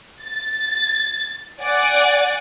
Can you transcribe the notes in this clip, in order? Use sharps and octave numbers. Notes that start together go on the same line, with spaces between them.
A6
D5 F#5 G#5 D6